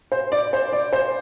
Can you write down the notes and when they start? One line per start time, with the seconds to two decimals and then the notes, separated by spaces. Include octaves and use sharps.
0.12 C5
0.32 D5
0.53 C5
0.73 D5
0.93 C5